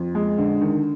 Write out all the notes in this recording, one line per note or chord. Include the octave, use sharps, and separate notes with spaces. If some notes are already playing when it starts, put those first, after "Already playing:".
Already playing: F2
G#3
D3
D#3